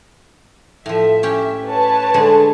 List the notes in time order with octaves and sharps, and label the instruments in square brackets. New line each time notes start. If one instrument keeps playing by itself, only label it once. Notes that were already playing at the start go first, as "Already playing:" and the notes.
[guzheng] A2 F3 [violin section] E5
[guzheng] C#4 G4
[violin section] B4 C#5 A5
[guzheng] D3 G#3